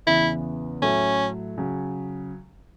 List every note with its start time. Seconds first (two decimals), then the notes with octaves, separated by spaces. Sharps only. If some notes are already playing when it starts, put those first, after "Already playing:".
0.07 E2 C#3 E3 B3 E4
0.82 A2 F#3 A3 C#4
1.58 C#3 F#3